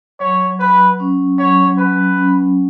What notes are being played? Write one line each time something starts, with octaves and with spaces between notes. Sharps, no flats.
F#3 C#5
F#3 B4
C#4
F#3 C#5
F#3 B4
C#4